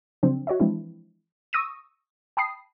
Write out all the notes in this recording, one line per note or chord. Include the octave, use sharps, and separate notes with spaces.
C#3 F3 F#3 C4 D4
F#4 C#5 D#5 E5
E3 F3 G#3 C4 D4 E4
C#6 D#6 E6 A#6 D#7
G5 A5 B5 D#6 C7